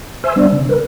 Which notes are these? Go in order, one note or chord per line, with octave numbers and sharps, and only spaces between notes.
C5 E5 G#5 C6 E6
G3 B3 D4 D5
C#3
A#4 B4